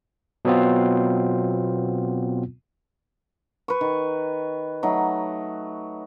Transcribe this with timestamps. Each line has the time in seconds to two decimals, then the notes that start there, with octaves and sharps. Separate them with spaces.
0.45 B2 F#3 B3 C4 F4
3.68 B4 C#6
3.81 D#3
4.83 F#3 A3 D#4